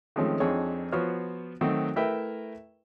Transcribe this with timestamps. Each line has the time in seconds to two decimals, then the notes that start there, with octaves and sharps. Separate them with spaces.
0.16 D#3 F3 G#3 A3 C4 C#4
0.40 F2 C4 D4 D#4 G#4 C#5
0.92 F3 B3 F#4 C5 C#5 F6
1.61 D#3 F#3 A3 C4 F#4
1.96 A3 E4 A#4 B4 E5 G5